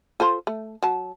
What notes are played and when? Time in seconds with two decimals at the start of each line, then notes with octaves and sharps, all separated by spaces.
0.20 F4 A4 C5
0.47 A3
0.83 F#3 A5